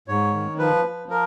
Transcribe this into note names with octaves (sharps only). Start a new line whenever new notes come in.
G#2 C#5
D#3
F3 B4
F3
A#4